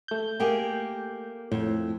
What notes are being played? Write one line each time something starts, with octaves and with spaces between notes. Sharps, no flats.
A3 G6
A#3 G4 G#4
F2 A2